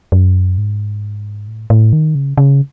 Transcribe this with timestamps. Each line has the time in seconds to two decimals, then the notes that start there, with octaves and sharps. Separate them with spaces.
0.12 F#2
0.58 G#2
1.48 A2
1.70 A2
1.93 D#3
2.15 C#3
2.37 C#3